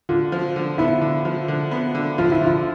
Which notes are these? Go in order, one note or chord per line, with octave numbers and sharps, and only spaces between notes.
D3 F4
F3
D3
B3 E4
D3
F3
D3
B3
D3
F3 F4
E4
D3 F4